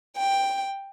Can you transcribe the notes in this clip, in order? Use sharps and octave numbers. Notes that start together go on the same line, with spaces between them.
G5